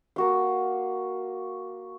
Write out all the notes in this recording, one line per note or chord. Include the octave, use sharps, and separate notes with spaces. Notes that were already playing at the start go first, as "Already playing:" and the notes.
A#3 F#4 F5